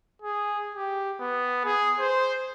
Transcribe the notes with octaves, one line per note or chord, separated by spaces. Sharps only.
G#4
G4
B3
G#4
C5